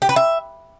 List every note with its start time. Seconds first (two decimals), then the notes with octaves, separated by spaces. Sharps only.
0.02 G4
0.09 B4
0.16 E5